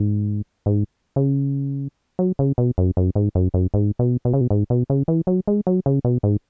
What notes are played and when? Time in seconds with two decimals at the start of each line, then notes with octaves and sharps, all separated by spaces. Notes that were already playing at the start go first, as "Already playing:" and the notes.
Already playing: G#2
0.66 G#2
1.16 C#3
2.19 F#3
2.39 C#3
2.58 B2
2.78 F#2
2.97 F#2
3.15 G#2
3.35 F#2
3.54 F#2
3.74 G#2
3.99 B2
4.25 B2
4.34 C#3
4.41 B2
4.50 G#2
4.70 B2
4.90 C#3
5.08 E3
5.27 F#3
5.47 G#3
5.67 F#3
5.86 C#3
6.05 B2
6.23 G#2